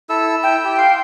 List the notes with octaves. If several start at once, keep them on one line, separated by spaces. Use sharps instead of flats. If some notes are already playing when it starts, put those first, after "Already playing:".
E4 A4 E6
E4 G5 E6
G4
F5 C6